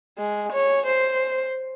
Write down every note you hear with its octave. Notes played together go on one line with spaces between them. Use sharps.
G#3
C#5
C5